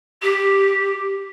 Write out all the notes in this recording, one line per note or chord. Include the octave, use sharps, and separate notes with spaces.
G4